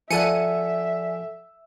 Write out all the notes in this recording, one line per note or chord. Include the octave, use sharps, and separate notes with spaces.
F3 A4 D5 E5 F#5 G#5 C#7 D#7